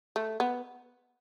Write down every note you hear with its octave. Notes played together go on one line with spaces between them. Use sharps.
A3
B3